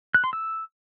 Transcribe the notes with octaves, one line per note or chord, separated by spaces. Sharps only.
F#6
C6
E6